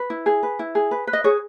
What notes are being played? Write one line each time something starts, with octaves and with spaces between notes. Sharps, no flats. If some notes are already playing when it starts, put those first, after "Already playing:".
Already playing: B4
E4
G#4
B4
E4
G#4
B4
B4
D#5
G#4 C#5